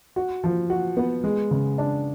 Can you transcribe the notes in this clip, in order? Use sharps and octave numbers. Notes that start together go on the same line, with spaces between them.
F#4
F3
F#4
B3
G#3
C#3
D4